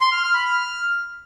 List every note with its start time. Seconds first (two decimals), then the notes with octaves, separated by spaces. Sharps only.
0.01 C6
0.12 F6
0.23 F6
0.34 B5
0.45 F6